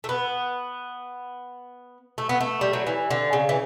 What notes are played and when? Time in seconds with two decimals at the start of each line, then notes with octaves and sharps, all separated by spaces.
0.04 A3
0.09 B3
2.18 A3
2.29 B3
2.41 A3
2.61 G3
2.73 F#3
2.87 E3
3.11 D3
3.33 C#3
3.49 E3